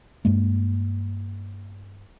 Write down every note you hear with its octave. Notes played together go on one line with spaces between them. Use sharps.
G2 G#3 A#3